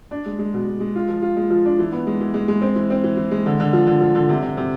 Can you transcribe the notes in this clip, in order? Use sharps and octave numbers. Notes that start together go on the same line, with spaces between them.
D4
G#3
G#3
B2
G#3
G#3
F4
F3
F4
G#3
F3
D4
E3
B3
G#3
E3
G#3
G#3
C4
E3
C4
E3
E3
G#3
D3
D3
F3
D3
F3
D3
C3
C3
C3